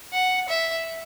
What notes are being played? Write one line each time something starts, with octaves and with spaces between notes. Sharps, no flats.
F#5
E5